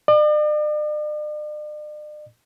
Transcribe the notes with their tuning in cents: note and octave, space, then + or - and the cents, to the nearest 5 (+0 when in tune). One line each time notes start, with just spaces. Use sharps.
D5 +45